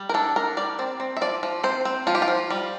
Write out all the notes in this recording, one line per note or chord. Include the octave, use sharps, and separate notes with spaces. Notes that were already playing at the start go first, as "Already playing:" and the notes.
Already playing: G3
A#4
D4 A4
D4 A#4
G3 D5
C4 D5
C4
E5
F3 D5
F3
C4 C5
C4
F3 F4
G4
F4
F3
G3